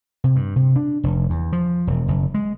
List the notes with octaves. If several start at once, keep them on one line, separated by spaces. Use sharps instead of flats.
C3
G2
C3
D4
F1
E2
F3
E1
F#1
G#3